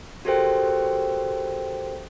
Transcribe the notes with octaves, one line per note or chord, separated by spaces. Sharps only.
F#4 G4 A4 A#4 C5 G5